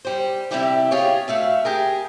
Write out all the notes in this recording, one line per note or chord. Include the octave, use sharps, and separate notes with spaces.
G3 C5
C3 D#3 G3 E4 G4 E5
F4 G4 G#4 C#5
D2 A3 E5 F5
G4 G#4 A#4